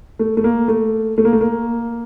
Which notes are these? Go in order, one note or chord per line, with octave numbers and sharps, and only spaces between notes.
A3
A3
A#3
A3
A3
A#3
A3
A#3